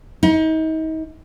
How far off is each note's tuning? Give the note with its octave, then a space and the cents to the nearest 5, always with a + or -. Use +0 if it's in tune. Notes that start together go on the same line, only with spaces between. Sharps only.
D#4 +35